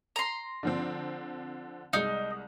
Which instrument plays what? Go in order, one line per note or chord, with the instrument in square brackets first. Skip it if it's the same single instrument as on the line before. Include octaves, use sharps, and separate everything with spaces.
[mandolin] A#5 C6
[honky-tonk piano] D3 F3 C4
[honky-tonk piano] C2 G#3 [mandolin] D#4